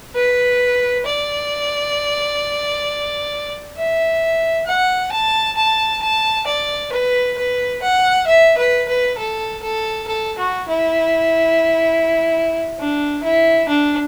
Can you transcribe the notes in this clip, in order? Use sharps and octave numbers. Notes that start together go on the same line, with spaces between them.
B4
D5
E5
F#5
A5
A5
A5
D5
B4
B4
F#5
E5
B4
B4
A4
A4
A4
F#4
E4
D4
E4
D4